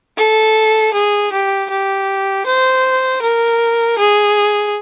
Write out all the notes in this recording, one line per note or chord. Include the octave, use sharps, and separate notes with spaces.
A4
G#4
G4
G4
C5
A#4
G#4